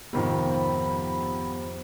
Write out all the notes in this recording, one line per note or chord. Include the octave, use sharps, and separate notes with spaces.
F2 G#2 C3 D#3 F3 B3 B5